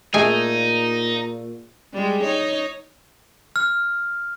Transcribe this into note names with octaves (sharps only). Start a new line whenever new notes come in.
A#2 A3 D#4 G#4 D#5 G#5
G3 G#3
D#4 C#5
F6